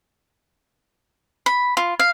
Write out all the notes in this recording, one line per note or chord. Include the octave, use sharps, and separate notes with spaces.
B5
F4
F5